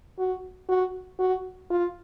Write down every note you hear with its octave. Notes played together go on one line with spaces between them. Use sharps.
F#4
F#4
F#4
F4